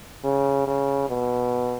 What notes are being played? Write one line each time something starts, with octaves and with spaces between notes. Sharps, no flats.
C#3
C#3
B2